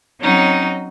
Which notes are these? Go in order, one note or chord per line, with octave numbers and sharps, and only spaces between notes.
F#3 C4 C#4 D#4 D#5